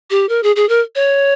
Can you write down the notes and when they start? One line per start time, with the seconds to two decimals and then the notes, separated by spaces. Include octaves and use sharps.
0.10 G4
0.29 A#4
0.43 G#4
0.56 G#4
0.69 A#4
0.95 C#5